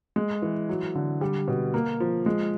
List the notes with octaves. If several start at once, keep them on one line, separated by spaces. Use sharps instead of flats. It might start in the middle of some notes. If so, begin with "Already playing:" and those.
G#3
E3
F#3
D3
G3
B2
A#3
F3
G#3